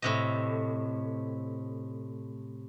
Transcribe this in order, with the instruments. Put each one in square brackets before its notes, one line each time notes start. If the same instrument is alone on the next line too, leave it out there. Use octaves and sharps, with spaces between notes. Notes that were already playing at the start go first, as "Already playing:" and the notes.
[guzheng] A2 C3 D#5